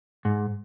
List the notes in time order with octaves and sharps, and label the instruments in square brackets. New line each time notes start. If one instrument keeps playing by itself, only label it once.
[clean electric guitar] G#2